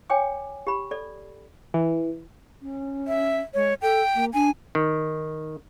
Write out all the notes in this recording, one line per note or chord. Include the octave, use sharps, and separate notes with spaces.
C#5 G5 G#5 D6
G4 B5
A4 D5
E3
C#4
E5
G#3 C#5
A4 G5
A#3
D4 G#5
D#3